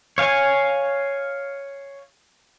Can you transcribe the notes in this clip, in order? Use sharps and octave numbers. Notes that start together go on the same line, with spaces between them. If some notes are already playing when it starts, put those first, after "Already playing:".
C#5 F5 G#5